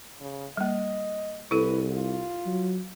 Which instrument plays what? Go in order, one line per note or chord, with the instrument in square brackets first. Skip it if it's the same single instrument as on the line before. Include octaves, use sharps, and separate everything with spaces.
[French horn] C#3
[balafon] G3 A#3 [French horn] D#5
[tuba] C2 [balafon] E4 A4 [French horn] B4
[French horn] F4
[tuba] F#3